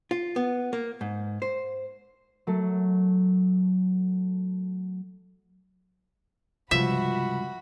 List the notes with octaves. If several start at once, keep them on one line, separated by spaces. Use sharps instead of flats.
F4
B3
A#3
G#2
C5
F#3 A3
C#2 G2 C3 F3 F#4 E5 B5